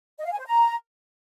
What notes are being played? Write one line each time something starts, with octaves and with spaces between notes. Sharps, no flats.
D#5
F5
G#5
C5
A#5